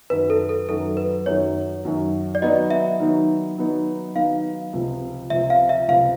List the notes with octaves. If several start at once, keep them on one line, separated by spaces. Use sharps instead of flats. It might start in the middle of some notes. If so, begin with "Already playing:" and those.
F#2 D#3 F#3 B4
A4
A4
F#2 D#3 F#3 A4
B4
F#2 D#3 F#3 C#5
F#2 D#3 F#3
D5
D#3 F#3 B3 D#4 D#5
E5
D#3 F#3 B3 D#4
D#3 F#3 B3 D#4
D#3 F#3 B3 D#4 F5
C#2 C3 F3
C#2 C3 F3 E5
F5
E5
C#2 C3 F3 F5